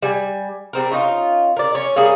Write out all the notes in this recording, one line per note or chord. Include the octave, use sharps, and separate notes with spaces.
G3 G#5
G3 C4 A#4
C#4 D#4 F4
A#4 D5
C#4 C#5
G3 A#3 C#4 G#4